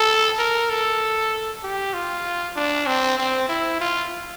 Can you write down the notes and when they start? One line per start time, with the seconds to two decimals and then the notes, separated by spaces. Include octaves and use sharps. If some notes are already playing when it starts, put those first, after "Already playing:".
Already playing: A4
0.39 A#4
0.70 A4
1.63 G4
1.94 F4
2.56 D4
2.87 C4
3.18 C4
3.49 E4
3.81 F4